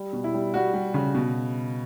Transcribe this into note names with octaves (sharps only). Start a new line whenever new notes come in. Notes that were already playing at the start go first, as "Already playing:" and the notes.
Already playing: G3
B2
E4
G3
G3 F#4
G3
C#3
B2